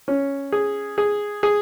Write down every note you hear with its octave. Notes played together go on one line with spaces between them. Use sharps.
C#4
G#4
G#4
G#4